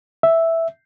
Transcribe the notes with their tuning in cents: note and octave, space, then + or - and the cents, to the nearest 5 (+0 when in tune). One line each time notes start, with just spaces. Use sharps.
E5 +0